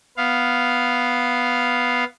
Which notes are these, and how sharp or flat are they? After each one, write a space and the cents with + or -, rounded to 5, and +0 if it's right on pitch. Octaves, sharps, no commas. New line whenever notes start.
B3 +0 F5 +0